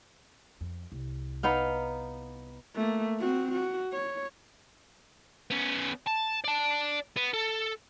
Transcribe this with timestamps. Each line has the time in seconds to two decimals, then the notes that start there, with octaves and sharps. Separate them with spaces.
0.61 F2
0.92 C2
1.43 B3 D#4 F5
2.76 A3 A#3
3.20 C4 F#4
3.52 F#4
3.93 C#5
5.51 B3 C#4
6.06 A5
6.44 D5 A5
7.17 B3
7.34 A4